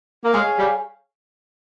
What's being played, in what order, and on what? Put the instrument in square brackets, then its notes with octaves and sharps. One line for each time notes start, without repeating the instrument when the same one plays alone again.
[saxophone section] A#3
[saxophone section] G#3 [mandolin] G#4 C#5 F5 G#5
[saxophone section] G3